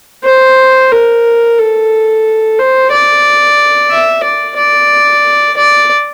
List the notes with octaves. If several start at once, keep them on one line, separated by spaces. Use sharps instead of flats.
C5
A#4
A4
C5
D5
E5
D5
D5
D5